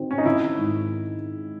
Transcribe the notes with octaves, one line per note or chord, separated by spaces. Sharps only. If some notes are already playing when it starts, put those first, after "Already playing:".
Already playing: D#3 C4 F#4
C#4
D#4
D#3 E4
G#2